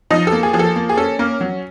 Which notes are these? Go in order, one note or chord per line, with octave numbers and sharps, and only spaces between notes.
F3 D#4 D#5
A4
A#3
G#4
F3 G#4
A4
A#3
G#4
C#4 A4
A#3 C#4 A#4
F#3